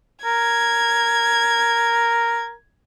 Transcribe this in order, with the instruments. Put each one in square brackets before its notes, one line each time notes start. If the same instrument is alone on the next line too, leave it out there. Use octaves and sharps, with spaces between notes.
[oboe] A#4 [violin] G#6